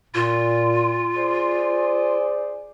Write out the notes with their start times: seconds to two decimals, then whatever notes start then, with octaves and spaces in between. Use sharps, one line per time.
0.15 A#2 F4
1.16 G#4 C5 D5